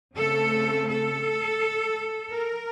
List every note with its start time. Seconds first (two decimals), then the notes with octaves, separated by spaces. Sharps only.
0.16 C#3 A3 C4 A4
0.87 A4
2.31 A#4